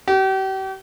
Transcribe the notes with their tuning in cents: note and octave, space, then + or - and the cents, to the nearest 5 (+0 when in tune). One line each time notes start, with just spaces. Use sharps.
G4 -40